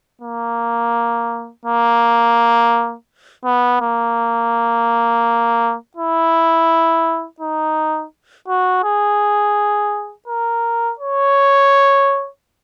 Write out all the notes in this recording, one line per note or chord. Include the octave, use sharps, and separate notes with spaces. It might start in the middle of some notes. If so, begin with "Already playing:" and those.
A#3
A#3
B3
A#3
E4
D#4
F#4
G#4
A#4
C#5